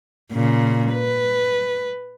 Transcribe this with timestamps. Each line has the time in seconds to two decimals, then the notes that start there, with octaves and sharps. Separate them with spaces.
0.32 A#2 C#3
0.93 B4